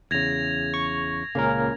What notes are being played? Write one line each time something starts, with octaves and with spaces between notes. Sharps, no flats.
E2 C#3 G#6 A#6 F7
C#6
C#2 A#2 C#3 A#3 C#4 A#4